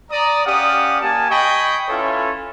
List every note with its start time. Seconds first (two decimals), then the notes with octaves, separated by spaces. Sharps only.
0.11 D5 A#5 D#6
0.45 C#4 G4 D5 F5 F#5 D#6
1.01 A#3 G4 G#5 A5
1.30 D#5 G5 G#5 B5 C#6
1.88 C#4 E4 F4 A4 B4 C#5